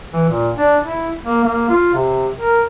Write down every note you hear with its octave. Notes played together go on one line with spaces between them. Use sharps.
E3
A#2
D4
E4
A#3
A#3
F4
C3
A#4